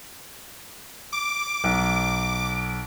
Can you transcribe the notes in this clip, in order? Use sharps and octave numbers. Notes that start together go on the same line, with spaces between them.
D6 D7
B1